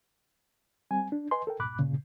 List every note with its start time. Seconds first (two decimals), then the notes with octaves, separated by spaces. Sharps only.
0.91 G3 C4 G#5
1.12 D4
1.31 B4 D#5 G#5 C6
1.47 A4 A#4 G5
1.59 C2 G2 A#2 B5 D6 F#6
1.79 G2 A#2 C#3